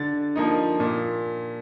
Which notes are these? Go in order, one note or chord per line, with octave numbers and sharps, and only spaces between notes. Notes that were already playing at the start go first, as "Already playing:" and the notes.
Already playing: D3 A6
F3 A#3 D#4
A#2